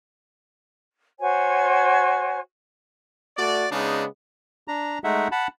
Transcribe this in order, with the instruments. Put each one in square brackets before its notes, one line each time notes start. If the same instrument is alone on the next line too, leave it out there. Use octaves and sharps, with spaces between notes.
[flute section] F#4 C5 C#5 G#5
[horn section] A3 F#4 D5
C#3 G#3 B3 D4 D#4
[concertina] D4 A#5
G#3 A3 D#4 E5 F#5
F#5 A5 B5